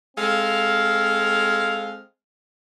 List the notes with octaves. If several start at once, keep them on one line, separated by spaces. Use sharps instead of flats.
G#3 C4 A4 F5